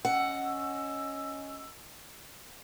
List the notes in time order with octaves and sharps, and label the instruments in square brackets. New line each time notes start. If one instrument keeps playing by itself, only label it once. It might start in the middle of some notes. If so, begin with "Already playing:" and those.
[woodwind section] C#4 D#5 E6 [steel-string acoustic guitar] F#5